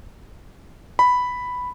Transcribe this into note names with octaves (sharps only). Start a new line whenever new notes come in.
B5